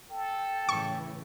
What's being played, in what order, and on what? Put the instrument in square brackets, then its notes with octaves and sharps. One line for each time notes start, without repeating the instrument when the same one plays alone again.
[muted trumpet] A4 [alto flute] G5
[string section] A2 C#3 E3 [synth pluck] C#6